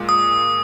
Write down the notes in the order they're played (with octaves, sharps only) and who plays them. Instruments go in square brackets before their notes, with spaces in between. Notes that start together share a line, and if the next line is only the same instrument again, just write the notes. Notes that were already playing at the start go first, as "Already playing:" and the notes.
Already playing: [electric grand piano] A#2 G#3
[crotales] D#6